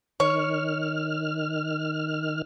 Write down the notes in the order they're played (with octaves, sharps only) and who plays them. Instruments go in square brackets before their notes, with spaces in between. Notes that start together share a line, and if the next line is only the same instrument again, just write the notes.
[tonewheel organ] D#3 F6 [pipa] C#5